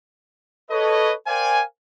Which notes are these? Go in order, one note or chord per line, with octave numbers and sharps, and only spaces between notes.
A4 B4 C#5 D#5
A#4 C5 D5 F5 G5 G#5